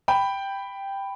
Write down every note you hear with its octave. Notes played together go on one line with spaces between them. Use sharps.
G5 B5